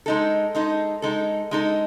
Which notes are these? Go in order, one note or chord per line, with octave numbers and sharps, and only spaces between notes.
G#3 D#4 A4
G#3 D#4 A4
G#3 D#4 A4
G#3 D#4 A4